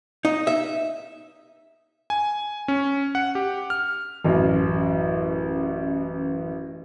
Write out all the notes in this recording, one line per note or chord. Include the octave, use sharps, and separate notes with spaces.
D#4
E5
G#5
C#4
F#5
G4
F6
A1 F#2